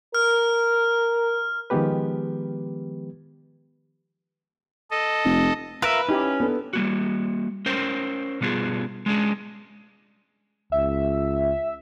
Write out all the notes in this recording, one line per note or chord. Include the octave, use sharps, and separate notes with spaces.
A#4 F6
D#3 F3 G#3 B3 G4 B4
A4 D#5
F1
F4 A#4 B4 E5 F7
C#4 D#4 E4 G4
B3 D4 A4
G3 A#3 F#4
C#4 A#4 C5 G5
B2 G3 B3 F4 G#4
G#3 C#4 D4 G#4
C#2 E5